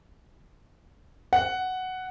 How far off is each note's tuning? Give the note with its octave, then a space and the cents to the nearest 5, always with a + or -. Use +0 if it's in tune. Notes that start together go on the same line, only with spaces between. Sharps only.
F#5 +5